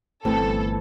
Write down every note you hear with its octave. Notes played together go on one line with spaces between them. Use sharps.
G1 G2 E3 A3 C4 A4